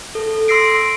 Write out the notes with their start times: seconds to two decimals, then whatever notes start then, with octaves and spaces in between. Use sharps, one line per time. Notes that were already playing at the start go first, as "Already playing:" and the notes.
0.15 A4
0.48 C6 E6 A#6 C7 D7